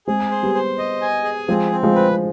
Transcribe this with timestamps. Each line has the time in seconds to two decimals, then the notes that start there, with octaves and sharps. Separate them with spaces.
0.07 G#3 C4 G#4
0.31 C5
0.43 G3 B3
0.54 C5
0.78 D#5
1.02 G#5
1.24 G#4
1.48 F3 G#3 C4
1.71 C4
1.83 F3 G#3
1.96 B4